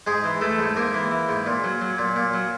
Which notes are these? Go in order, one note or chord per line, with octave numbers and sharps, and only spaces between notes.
G#2 G#3 G#4
E3
E3 A3 A4
G#2
G#2 A#3 A#4
E3
E3
G#2
A#2
F#3
F#3
A#2
A#2
F#3